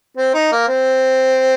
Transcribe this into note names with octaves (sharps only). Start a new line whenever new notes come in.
C4
D#4
A#3
C4